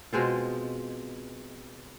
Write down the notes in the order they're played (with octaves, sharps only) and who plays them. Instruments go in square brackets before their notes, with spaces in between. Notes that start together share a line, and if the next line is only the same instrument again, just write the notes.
[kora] B2 G#3 C4 F4